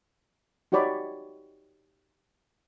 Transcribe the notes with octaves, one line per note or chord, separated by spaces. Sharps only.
D#4 F#4 G4 C#5 D5 B5